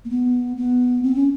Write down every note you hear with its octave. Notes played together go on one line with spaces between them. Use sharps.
A#3
B3
B3
C4
C#4